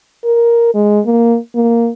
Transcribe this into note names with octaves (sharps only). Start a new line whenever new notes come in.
A#4
G#3
A#3
A#3